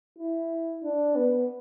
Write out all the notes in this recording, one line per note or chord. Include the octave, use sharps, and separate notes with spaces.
E4
D4
B3